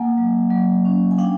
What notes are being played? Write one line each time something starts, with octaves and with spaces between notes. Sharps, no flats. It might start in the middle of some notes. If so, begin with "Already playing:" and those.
Already playing: A#3 F#5 G#5
F#3
F#3
C#4
G#5
D4 F5 G5